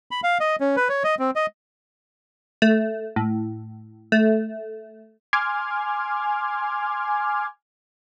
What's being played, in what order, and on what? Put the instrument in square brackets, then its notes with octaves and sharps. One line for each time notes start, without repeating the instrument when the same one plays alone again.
[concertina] B5
F5
D#5
C#4
B4
C#5
D#5
C4
D#5
[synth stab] A3
A2
A3
[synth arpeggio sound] G#5 C6 D6 F6 G#6